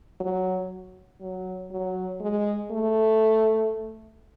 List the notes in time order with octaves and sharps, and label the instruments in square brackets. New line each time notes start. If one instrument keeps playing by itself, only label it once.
[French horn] F#3
F#3
F#3
G#3
A3